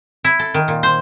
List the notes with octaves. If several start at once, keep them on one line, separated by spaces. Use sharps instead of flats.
E4
A4
D#3
A#2
C5